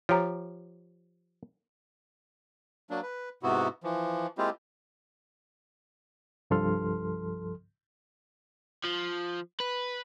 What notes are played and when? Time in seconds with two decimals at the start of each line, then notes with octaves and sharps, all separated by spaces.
0.09 F3 G4 C#5 A#5
2.90 F#3 A#3 D4
3.02 B4
3.43 G#2 C3 B3 E4 F#4
3.84 E3 F3
4.38 G#3 A#3 C4 E4 F4 G4
6.50 C2 G2 F3 A4 C6 F6
8.84 F3
9.60 B4